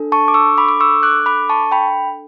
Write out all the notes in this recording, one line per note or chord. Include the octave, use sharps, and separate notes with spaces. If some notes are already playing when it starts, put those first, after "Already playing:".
Already playing: D4 A4
A5 C#6
D6
C#6 E6
B5 D6
D6
C#6 E6
D6 F#6
B5 D6
A5 C#6
G5 B5